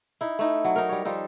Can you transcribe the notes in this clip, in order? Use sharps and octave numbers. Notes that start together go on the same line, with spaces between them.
D#4 E4
A3 D#4 E4
F#3
D#4 A#4
G3 C#5
F3 G3 D#4 A4